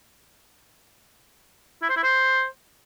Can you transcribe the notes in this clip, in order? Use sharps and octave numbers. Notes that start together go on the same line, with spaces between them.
E4
C5
E4
C5